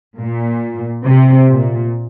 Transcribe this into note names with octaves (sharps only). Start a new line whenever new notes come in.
A#2
C3
A#2